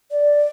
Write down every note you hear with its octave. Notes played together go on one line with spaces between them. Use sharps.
D5